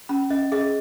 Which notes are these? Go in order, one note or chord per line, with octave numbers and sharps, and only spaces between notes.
C#4 B5
C#4 D#5
G#4 D#5